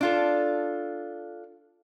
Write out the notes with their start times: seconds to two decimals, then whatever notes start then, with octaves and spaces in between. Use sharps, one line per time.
0.01 D4 F4 A4